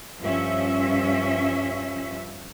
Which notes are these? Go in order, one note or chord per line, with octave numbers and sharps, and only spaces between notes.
G2 F3 C#4 E5